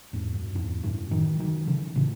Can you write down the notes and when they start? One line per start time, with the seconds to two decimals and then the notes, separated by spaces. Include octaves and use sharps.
0.13 E2 G#2
0.34 F#2
0.55 E2 G#2
0.83 F#2 A2
1.11 D#3 F#3
1.40 D#3 F#3
1.67 C#3 E3
1.95 A2 C#3